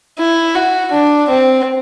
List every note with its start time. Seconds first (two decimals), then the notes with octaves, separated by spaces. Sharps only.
0.18 E4
0.55 F#4
0.92 D4
1.29 C4